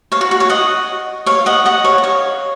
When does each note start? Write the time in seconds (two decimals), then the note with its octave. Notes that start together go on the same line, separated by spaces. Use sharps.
0.12 C#5 F5
0.21 F#4
0.31 F#4
0.40 C#5 F5
0.50 D#5 F#5
1.26 C#5 F5
1.46 D#5 F#5
1.66 D#5 F#5
1.84 C#5 F5
1.98 D#5
2.04 C#5 F5